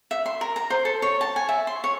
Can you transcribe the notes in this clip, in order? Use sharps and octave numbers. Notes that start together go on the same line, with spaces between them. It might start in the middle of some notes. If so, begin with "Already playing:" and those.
E5
C6
A#4
A#5
C5
A4
C#5
A5
G#5
E5
C6
C#5